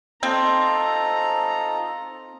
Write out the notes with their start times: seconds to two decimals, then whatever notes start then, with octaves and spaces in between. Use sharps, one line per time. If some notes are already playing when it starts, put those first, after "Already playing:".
0.23 C4 D#4 F4 A4 A#5